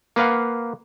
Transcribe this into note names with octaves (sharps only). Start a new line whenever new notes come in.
A#3 B4 F5 F#5